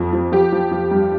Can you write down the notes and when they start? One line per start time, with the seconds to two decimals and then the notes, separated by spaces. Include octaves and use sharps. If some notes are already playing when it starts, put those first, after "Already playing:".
Already playing: F2 F3
0.13 F3
0.32 F3 G4
0.52 F3
0.71 F3
0.91 G2